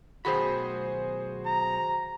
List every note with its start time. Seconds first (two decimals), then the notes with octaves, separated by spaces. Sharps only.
0.25 B1 D#3 F#4 G#4 C5 B5
1.46 A#5